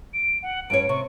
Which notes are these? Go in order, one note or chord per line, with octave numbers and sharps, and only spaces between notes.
D7
F#5
G2 C#4 C#5 D7
C3 C#6